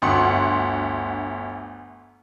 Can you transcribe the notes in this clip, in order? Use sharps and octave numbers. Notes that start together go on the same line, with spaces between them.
G1 D2 F#5 C6